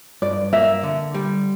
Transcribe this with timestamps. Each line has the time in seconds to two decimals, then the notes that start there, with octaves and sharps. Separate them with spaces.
0.22 G2 D5
0.53 A#3 E5
0.83 D3
1.14 G3